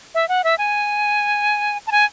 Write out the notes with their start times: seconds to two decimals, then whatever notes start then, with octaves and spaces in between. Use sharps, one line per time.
0.15 E5
0.29 F#5
0.44 E5
0.58 G#5
1.87 A5
1.92 G#5